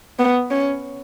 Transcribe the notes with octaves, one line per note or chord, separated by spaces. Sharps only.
B3
C#4